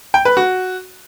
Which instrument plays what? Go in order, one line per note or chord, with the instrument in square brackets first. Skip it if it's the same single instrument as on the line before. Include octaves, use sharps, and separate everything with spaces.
[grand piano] G5
B4
F#4